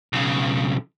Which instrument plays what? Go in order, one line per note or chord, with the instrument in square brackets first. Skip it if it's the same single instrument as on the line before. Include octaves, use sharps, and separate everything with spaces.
[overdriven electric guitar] B1 C#3